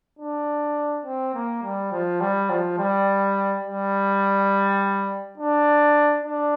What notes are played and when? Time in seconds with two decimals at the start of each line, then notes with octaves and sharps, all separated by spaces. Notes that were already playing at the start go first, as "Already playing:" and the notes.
0.19 D4
1.05 C4
1.34 A#3
1.63 G3
1.92 F3
2.21 G3
2.50 F3
2.78 G3
3.65 G3
5.38 D4
6.24 D4